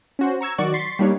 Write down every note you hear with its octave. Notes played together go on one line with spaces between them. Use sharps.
C#4 F#4 C5
A#5 C#6 E6 G#6
D#3 F#3 F#4 D5 C#6 F#6
C6 C#6 A6 B6 C7
G3 A#3 D4 D#4 C#5